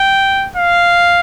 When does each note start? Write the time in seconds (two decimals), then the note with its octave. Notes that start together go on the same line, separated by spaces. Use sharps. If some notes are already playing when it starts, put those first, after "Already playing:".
Already playing: G5
0.56 F5